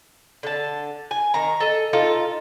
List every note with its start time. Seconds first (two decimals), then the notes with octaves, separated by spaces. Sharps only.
0.43 D3 A5
1.11 G#5
1.34 D#3 A#5
1.60 A4 D#5
1.93 D#4 F4 A4